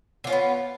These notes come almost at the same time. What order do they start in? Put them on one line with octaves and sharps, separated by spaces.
D3 F4 C#4 B3